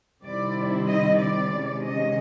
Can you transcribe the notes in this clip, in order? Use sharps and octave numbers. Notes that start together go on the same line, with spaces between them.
C3 D#3 G3 C4 E4 D5
D#5
D5
C3 D#3 G#3 C#4
D#5